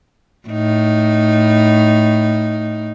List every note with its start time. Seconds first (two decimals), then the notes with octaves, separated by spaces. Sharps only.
0.49 A2 D#4